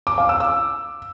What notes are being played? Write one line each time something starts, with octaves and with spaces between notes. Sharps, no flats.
D6
F5
E6
E6